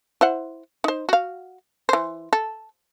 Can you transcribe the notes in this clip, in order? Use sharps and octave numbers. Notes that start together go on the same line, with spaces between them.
E4 C5 F#5
D#4 C5
F#4 F5
E3 C5
A4